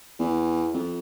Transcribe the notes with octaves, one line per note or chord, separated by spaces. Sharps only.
E2
F2